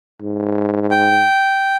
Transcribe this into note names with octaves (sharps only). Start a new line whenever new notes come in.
G#2
G5